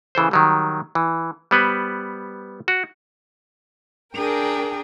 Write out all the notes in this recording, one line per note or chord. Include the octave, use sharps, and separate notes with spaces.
C#3 E3 A4 C5
D#3 F#3 G3
E3
G3 B3 B4 C5
F#4
D4 G#4 A#4 G5